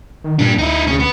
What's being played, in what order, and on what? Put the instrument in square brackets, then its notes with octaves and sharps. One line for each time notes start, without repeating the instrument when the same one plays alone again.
[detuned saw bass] D#3
[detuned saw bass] A#2 [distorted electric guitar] G3 D4
[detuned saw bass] D2 [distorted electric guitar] D#4 E4
[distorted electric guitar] C#4 G#4
B3